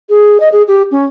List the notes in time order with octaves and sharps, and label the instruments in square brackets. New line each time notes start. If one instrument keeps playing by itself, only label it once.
[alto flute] G#4
D#5
G#4
G4
C#4